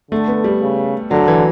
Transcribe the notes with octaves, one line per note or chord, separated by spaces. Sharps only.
D3 A3
B3
G3
C#3
D3 F#3
E3